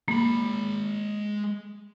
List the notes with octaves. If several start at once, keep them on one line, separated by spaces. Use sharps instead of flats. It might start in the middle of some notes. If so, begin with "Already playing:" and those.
G#3 A#3 B5